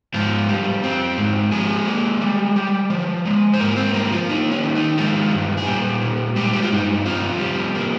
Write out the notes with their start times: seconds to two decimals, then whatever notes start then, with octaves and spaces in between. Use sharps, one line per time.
0.14 G#2 F3 F4
0.49 G3
0.84 C4
1.18 G#2
1.52 F3 G#3 G#4
1.87 A#3
2.21 G3
2.56 G3
2.90 F3
3.25 G#3
3.54 C5
3.60 G#2 A#3 A#4
3.77 C4 C5
3.94 G3 A#3 A#4
4.12 F3 F4
4.29 A#3 D#4
4.51 C#4
4.64 D#3
4.75 D#4
4.98 F3 G#3 F4
5.33 G2
5.57 G#4
5.67 A#2 G3 G4
6.01 A#2
6.36 G3 G#3 G4
6.53 G4
6.62 F4
6.71 G2 D#4
7.05 C3 F3 F4
7.40 G3
7.75 A#3